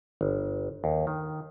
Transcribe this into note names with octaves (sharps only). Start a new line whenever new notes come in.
G1
D#2
D#3